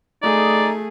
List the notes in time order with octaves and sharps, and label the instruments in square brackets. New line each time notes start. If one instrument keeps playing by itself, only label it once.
[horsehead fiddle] A3 G#4 [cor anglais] D#4 [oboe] D5